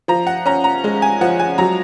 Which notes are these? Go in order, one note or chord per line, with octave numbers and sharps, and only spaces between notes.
F3 A#5
F#5
C#4 A#5
A#5
G#3
G#5
F3 F#5
G#5
F#3 A#5